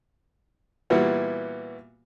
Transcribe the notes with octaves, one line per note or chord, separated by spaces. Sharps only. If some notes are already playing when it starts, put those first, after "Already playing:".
A#2 E3 G3 B3 E4 F#4